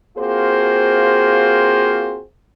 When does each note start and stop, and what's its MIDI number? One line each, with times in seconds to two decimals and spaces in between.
0.18 2.20 58
0.18 2.20 60
0.18 2.20 65
0.18 2.20 66
0.18 2.20 68
0.18 2.20 72